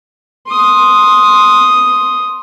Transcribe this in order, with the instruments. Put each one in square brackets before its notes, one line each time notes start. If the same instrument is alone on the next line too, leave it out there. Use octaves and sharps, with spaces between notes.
[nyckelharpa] C6 D#6